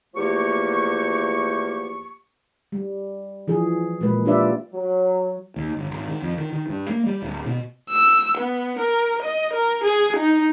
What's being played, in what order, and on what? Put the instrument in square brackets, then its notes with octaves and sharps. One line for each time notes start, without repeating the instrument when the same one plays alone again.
[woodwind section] E2 F3 A3 A#3 G4 C#6
[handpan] G3
E3 F3 G#4
A#2 G#3 A#3 B4
D4 F4 G4 B4 D5 E5
[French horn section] F#3
[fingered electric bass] D#2
G1
G#1
D#3
F2
D#3
D#3
G2
A#3
G3
D1
B2
[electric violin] E6
B3
A#4
D#5
A#4
G#4
D#4